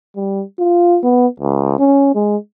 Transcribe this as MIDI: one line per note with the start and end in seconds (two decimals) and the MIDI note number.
0.16 0.43 55
0.59 0.98 65
1.04 1.27 59
1.40 1.75 37
1.79 2.13 61
2.15 2.37 56